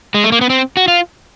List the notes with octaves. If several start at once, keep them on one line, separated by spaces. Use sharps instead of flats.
G#3
A3
A#3
B3
C4
F#4
F4